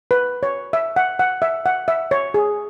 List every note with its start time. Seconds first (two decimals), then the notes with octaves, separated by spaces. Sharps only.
0.11 B4
0.43 C#5
0.73 E5
0.96 F#5
1.19 F#5
1.42 E5
1.66 F#5
1.88 E5
2.11 C#5
2.34 G#4